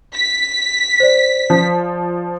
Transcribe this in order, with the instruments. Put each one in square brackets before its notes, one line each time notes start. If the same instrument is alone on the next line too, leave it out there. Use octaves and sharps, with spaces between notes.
[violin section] B6
[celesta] C5 D5
[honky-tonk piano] F3